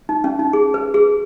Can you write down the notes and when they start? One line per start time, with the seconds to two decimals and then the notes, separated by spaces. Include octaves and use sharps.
0.09 D#4
0.24 C#4
0.39 D#4
0.53 G#4
0.74 B4
0.94 G#4